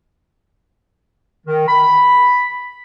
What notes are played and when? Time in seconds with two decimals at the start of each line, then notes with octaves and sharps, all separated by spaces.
1.46 D#3
1.68 B5